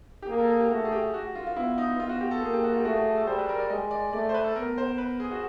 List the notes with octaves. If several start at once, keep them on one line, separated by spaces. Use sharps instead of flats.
G4
A#3 G#4
A4
G#4
G4
A3 F#4
A4
G#4
G4
F#4
F4
F4
B3 E4
D#4
B3 F4
F#4
G4
A4
A#3 G#4
G4
F#4
F4
G4
A3 F#4
G#4
G4
G#4
A4
G3 C5
B4
A#4
D5
G#3 D#5
D5
A3 D5
C5
B4
A4
B3 A#4
C5
B4
G#4
F#4